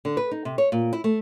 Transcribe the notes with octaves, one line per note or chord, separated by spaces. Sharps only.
D3
B4
D#4
C3
C#5
A#2
E4
A3